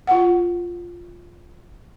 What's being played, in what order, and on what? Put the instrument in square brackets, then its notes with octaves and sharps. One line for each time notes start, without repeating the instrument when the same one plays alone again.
[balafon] F4 F#5